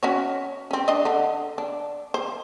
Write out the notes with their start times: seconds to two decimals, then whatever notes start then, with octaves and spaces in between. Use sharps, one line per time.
0.03 C#4 F#4 C#5
0.71 C4 C#4
0.88 D4 D#5
1.05 D3
1.58 D4
2.14 C5